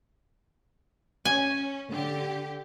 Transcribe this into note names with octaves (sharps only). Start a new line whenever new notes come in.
C#4 G#5
D3 G4